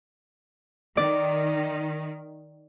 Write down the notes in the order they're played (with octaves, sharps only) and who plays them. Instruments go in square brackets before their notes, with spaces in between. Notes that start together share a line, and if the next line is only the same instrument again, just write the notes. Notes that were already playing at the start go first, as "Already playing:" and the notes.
[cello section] D#3 [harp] D5